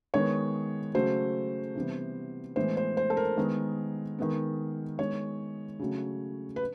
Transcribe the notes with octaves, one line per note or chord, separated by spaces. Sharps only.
D#3 G#3 B3 C#5
C#3 F#3 A3 C5
C3 E3 G3 B3
A2 E3 G#3 B3 C5
C5
C5
A4
A#4
D#3 G#3 B3
D#3 G#3 B3
D#3 G#3 B3 C#5
C#3 F#3 A3
B4